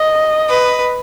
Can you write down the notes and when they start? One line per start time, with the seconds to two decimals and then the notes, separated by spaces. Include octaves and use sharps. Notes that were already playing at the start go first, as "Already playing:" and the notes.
Already playing: D#5
0.49 B4